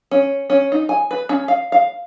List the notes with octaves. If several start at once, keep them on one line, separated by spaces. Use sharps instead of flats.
C#4
C#4
D#4
G#5
B4
C#4
F5
F5